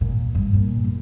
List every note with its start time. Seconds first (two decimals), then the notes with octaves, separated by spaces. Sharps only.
0.01 A#2
0.35 G2
0.54 A#2
0.84 F#2